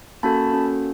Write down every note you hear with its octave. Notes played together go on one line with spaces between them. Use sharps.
A#3 C#4 F#4 A4 A5 B5
A#3 C#4 F#4 A4